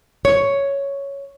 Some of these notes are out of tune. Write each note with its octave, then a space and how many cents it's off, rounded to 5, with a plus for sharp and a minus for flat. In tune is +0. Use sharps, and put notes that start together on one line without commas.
C#5 +5